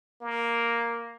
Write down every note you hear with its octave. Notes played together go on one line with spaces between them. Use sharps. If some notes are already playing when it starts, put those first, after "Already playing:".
A#3